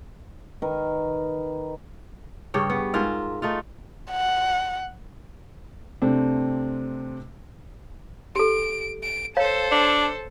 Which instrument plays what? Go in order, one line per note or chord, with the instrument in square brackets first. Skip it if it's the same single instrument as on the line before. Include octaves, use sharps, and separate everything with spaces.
[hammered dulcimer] D#3 A#4 B4
[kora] G2 C#3 G4 C#5
B3
G#2 F4 A#4 E5
A3 D#4 F4
[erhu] F#5
[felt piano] C3 A3 C4 D4
[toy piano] G4 A4 [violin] D7
[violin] D7
[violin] A4 C5 [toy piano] C#5 F5
[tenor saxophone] D4